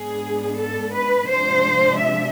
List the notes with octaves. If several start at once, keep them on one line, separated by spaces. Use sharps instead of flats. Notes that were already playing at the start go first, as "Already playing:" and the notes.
Already playing: G#2 G#3 B3 D4 G#4
A4
B4
C3 F3 G#3 D4 C5
E5